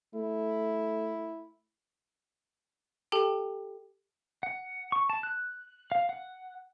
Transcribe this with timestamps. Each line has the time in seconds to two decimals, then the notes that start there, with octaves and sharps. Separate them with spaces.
0.15 A3 E4
3.12 G4 A4 G5 A5
4.43 F#5
4.92 C#6
5.10 A5
5.23 F#6
5.92 F5
6.09 F#5